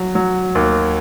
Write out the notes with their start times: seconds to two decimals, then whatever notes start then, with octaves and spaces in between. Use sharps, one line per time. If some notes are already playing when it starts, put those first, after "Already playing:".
Already playing: F#3
0.15 F#3
0.55 D#2